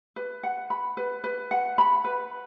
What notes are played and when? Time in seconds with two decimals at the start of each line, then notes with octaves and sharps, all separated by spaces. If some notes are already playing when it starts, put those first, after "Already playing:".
0.16 B4
0.43 F#5
0.70 B5
0.97 B4
1.24 B4
1.51 F#5
1.78 B5
2.04 B4